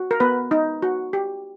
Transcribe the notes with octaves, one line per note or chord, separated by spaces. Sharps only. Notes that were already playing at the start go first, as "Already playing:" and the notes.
Already playing: F#4
A#4
B3 B4
D#4
F#4
G4